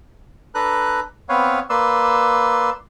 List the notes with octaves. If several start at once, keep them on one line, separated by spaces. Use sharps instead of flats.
D4 A4 B4 A#5 F#6
B3 C4 B4 C#5 F5
A#3 B4 D5 C6 E6